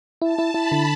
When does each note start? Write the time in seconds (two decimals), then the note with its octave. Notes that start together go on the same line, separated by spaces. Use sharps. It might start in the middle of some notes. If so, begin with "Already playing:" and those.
0.22 E4 A5
0.38 E4
0.54 E4 B5
0.72 D3